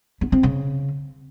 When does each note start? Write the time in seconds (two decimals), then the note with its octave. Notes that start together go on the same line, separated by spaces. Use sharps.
0.21 B3
0.32 C4
0.43 C#3